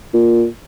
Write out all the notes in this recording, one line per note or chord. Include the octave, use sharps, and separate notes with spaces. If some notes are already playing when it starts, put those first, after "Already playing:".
A#2